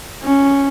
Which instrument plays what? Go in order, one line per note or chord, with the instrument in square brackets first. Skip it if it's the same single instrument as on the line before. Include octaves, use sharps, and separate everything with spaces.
[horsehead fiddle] C#4